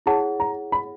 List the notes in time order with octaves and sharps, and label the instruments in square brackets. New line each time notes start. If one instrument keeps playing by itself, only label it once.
[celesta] E4 G#4 C#5 F#5 [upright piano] A5
[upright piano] A#5
B5